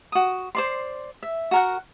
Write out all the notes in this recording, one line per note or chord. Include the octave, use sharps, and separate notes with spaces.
F#4 D#6
C5 D5 C6
E5
F#4 A#4 F#5